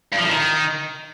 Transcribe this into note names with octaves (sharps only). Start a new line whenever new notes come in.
G2
F3
A2
D#3